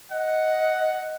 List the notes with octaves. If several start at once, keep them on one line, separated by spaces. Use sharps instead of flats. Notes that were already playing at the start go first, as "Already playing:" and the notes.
D#5 F#5